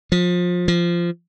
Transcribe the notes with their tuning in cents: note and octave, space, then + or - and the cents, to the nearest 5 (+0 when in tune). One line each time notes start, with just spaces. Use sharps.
F3 +25
F3 -15